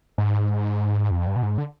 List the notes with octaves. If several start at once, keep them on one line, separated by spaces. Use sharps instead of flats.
G#2
F2
G2
B2
G#2
D3